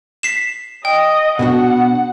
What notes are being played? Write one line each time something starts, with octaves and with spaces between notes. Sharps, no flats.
B6 C7 E7
D#5 G5
B2 D4 F#4 F#5